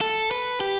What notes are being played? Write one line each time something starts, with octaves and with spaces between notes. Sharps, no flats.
A4
B4
G4